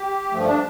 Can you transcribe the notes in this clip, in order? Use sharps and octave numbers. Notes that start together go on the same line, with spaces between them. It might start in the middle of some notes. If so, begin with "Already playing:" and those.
Already playing: G4
G2 F3 A3
D4